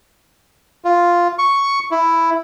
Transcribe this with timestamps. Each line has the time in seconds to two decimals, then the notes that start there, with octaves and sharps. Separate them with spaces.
0.85 F4
1.39 C#6
1.91 E4